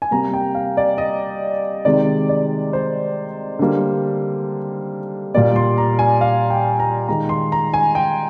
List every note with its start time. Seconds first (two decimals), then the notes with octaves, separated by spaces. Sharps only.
0.02 G#5
0.11 C3 G3 A#3 A#5
0.34 G5
0.55 F5
0.77 D5
0.98 D#5
1.85 C3 D#3 G#3 D5
2.29 D5
2.73 C5
3.59 D3 G3 A#3
5.34 A#2 G3 A#3 D5
5.56 C6
5.78 A#5
5.99 G#5
6.21 F5
6.50 G5
6.80 A#5
7.08 D#3 G#3 A#5
7.29 C6
7.52 A#5
7.74 G#5
7.95 G5